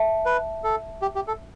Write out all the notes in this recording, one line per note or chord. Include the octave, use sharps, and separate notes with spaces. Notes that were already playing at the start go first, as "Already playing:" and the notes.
Already playing: E5 A5
B4
A4
G4
G4
A4